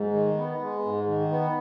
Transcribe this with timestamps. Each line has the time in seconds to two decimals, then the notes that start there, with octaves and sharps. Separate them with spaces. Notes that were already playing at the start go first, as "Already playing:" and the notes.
Already playing: G#2
0.13 D#3
0.37 B3
0.60 G#3
0.84 G#2
1.07 D#3
1.30 B3